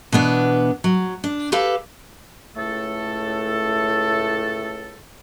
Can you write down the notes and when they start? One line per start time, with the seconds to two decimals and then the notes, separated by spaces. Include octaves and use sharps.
0.12 B2 E3 B3 D4
0.84 F#3
1.24 D4
1.52 G4 A4 B4 F5
2.56 C#2 A2 A3 A4